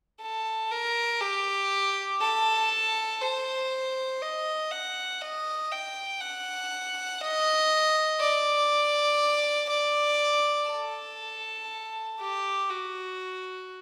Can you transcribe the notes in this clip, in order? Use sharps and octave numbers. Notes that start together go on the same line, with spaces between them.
A4
A#4
G4
A4
C5
D#5
F#5
D#5
G5
F#5
D#5
D5
D5
A4
G4
F#4